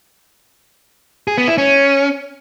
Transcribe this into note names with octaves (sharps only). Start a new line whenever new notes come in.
G#4
B3
E4
C#4